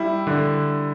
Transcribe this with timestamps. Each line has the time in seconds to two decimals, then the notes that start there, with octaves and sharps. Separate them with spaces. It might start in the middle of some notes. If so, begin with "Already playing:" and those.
Already playing: G3 E4
0.27 D3